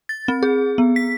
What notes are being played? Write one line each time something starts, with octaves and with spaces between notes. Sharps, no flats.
A6
C4
G#4
B3
B6